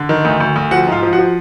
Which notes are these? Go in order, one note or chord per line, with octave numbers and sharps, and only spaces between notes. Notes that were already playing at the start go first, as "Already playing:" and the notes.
Already playing: D3
D#3
D2
D2
D2
F3 F#4 F#5
G#2 F4 F5
F3
F#4 F#5
F3